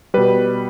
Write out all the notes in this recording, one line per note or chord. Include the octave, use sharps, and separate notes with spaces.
B2 G3 B4